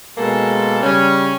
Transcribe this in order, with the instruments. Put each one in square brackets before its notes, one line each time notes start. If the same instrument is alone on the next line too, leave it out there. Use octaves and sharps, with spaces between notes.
[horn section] B2 G#3 A#3 C#4 A4
C#3 G3 C#4